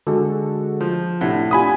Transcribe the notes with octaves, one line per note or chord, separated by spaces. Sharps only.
D3 G#3 F#4 G#4 A4
F3
A2 C3 D4 F#5
D4 F4 G4 G#5 B5 D#6